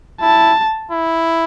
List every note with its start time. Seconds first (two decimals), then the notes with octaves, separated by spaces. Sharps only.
0.21 E4 A5
0.91 E4